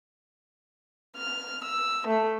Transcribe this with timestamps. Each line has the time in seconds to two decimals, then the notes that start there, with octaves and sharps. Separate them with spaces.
1.18 F6
1.64 E6
2.06 A3